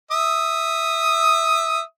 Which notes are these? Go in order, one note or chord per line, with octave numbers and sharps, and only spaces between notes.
E5 D#6